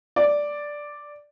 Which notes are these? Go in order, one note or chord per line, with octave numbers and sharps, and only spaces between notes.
D5